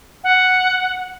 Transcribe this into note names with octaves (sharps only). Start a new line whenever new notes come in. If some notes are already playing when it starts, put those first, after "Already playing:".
F#5